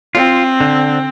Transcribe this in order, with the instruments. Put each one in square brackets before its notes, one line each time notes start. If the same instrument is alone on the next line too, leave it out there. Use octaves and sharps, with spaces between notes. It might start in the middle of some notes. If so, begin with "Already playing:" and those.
[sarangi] C4 [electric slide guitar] F4
[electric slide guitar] D3